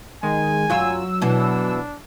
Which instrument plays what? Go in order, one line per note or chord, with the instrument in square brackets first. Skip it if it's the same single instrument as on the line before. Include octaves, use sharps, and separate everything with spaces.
[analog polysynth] D#3 G#3 [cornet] G#5
[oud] F#2 F4 [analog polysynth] F#3 E6
[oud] B2 E3 [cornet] D4